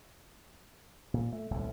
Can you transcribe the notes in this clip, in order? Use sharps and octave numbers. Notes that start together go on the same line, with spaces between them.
A#2
A3
D#1 C2 A#2 A3